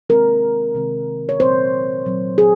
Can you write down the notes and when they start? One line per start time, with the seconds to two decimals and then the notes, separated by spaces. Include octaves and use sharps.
0.10 C3 D#3 G#3 C4 A#4
0.75 C3 D#3 G#3 C4
1.29 C#5
1.40 A#2 F#3 C4 C5
2.05 A#2 F#3 C4
2.38 G#4